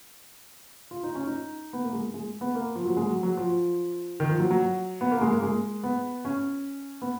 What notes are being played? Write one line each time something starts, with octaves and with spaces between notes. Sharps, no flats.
F4
D#4
C#4
D#4
B3
A#3
G#3
G#3
B3
A#3
F3
F#3
G#3
F#3
F#3
F3
D#3
F3
F#3
F#3
B3
A#3
G#3
A#3
G#3
B3
C#4
B3